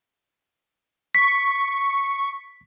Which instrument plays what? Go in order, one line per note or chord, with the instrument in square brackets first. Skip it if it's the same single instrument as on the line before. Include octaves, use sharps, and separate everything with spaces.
[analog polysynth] C#6 [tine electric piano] B6